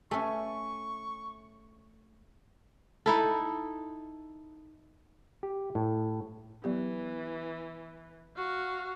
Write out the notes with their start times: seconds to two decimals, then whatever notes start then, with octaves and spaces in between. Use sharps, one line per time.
0.11 A3 C#4 E5 G#5 C#6
3.06 D#4 E4 A4
5.43 G4
5.75 A2
6.64 E3 F#3 B3 G4
8.37 F#4 F5